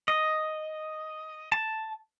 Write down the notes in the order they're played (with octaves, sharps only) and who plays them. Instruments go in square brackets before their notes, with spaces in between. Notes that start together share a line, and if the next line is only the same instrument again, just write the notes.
[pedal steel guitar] D#5
A5